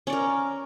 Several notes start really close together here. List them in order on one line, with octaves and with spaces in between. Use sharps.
C#4 D5 A#4